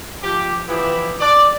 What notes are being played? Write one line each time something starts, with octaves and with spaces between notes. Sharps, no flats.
F3 G4
E3 F3 B3 E4 G4
D5